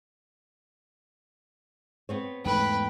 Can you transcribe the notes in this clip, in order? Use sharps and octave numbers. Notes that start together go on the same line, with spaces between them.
B3 C4 C#5
E2 G#2 A3 B4 G5